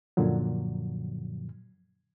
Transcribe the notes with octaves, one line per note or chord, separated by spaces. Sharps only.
F#2 A#2 D3 F3 F#3